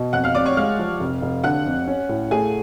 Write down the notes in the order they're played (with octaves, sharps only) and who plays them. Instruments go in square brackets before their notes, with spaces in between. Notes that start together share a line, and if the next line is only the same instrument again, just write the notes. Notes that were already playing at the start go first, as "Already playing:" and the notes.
Already playing: [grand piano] B2
[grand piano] F2 [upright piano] F#5 F#6
[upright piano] F5 F6
[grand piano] F2 [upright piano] D5 D6
[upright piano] C#5 C#6
[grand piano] G#3 [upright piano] F5 F6
[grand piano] F3
F1
F1
[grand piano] D3 [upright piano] F#5 F#6
[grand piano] F2
C#4
A2
[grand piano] A3 [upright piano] G#4 G#5